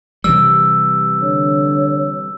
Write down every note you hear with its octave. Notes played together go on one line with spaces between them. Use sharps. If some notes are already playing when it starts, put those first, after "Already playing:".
C3 E3 G3 E6
D3 C#5